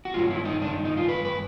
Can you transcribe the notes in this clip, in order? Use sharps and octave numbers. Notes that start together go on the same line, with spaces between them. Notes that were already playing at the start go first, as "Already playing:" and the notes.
F#4
G2 D#3 G#3 C#4 F4
E4
D#4
D4
D#4
D#4
F4
B4
B4